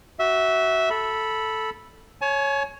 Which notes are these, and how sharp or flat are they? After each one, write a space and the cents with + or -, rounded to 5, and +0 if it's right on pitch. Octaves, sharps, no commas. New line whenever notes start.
F#4 +20 E5 -10
A4 +0 B5 -10
C#5 +0 G#5 +40